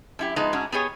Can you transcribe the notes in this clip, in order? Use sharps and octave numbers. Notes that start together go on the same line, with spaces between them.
F#2 E4 G4
F3 G#3 B3 D#4 B4
G#2 C#4 D4 F#4
B3 G4 G#4 C#5